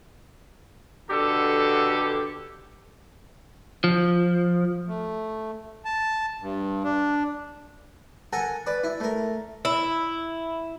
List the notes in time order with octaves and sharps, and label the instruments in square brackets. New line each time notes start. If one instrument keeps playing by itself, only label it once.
[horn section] B2 D3 G4 A4
[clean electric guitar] F3
[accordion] A3
A5
G2
D4
[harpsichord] A4 A#4 F#5 G#5 A#5
B4 D5
E4
A3 A#4
[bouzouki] E4